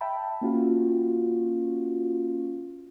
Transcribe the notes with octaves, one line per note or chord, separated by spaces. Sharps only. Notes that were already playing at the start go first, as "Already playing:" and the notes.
E5 G5 A5 B5
A#3 C#4 F4 F#4